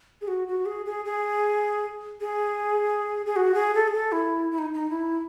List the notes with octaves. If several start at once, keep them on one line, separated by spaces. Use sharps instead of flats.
G#4
F#4
F#4
G#4
G#4
G#4
G#4
G#4
F#4
G#4
A4
G#4
A4
E4
E4
D#4
D#4
E4